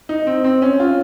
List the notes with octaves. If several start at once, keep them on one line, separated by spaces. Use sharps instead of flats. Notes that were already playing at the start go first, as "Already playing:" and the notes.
D#4
C4
C4
C#4
F4